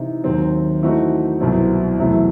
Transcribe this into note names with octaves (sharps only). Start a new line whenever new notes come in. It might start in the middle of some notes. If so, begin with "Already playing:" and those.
Already playing: C3 E3 D#4
D#2 D#3 F#3 C4
E3 A3 C4 D#4 F#4
C2 B2 F#3 C4 E4
E2 C3 F#3 A3 E4